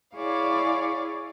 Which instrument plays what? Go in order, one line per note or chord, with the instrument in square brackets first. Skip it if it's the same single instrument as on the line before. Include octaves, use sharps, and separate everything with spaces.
[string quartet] E4 G#4 C#5 D5 F5 C#6